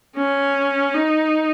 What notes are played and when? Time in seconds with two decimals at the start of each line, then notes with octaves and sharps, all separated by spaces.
0.17 C#4
0.94 D#4